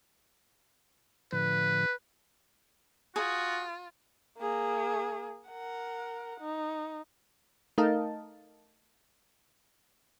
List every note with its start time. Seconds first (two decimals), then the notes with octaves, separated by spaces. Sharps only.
1.33 A2 D3 F3 B4
3.16 F4 F#4 G#4
4.39 A#3 G#4
5.48 A#4 F#5
6.40 D#4
7.78 A3 D#4 A#4 D#5 F5 A5